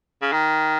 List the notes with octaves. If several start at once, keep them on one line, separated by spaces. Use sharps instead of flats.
C#3
D#3